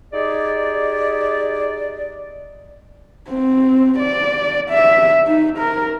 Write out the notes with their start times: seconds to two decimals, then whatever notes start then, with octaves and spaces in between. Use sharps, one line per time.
0.13 D#4 G4 G#4 D5
3.30 C4
3.99 D5
4.71 E5
5.27 D#4
5.59 A#4